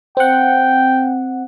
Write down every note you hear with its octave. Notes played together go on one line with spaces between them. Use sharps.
C4 F#5 G5